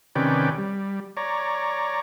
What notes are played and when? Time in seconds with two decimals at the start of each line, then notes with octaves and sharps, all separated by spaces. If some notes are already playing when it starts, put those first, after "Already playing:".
0.15 C3 D#3 C#4 B4 D5 G5
0.58 G3
1.17 C#5 D5 A#5